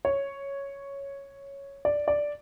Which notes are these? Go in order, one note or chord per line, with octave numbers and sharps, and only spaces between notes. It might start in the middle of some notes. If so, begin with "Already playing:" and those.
C#5
D5
D5